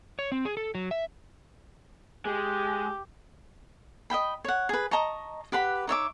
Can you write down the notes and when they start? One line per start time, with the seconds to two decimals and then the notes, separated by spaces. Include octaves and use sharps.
0.19 C#5
0.32 C4
0.45 G#4
0.57 A4
0.75 F#3
0.91 E5
2.25 G#3 G4
4.10 D#5 E5 G5 B5
4.44 C#5 F#5
4.69 G#4 B4
4.91 D#5 A5 A#5 C#6
5.52 G4 B4 F#5 B5
5.87 D#4 C#5 E5 D6